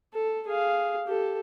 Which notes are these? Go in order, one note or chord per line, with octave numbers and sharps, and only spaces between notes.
A4
G#4 F5
G4 A4